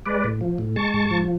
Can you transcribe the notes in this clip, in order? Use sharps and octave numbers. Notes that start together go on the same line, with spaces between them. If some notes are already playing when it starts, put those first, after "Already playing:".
G#3 B4 D5
A2
F3
A2
G#3 A5 C#6
G#2
F3